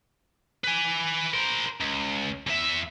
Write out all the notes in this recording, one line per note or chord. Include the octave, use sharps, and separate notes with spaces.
B4 G#5
A#4 C5
C#2
E2 E5